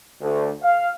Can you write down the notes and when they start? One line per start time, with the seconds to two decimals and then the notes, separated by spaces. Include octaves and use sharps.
0.20 D2
0.63 F5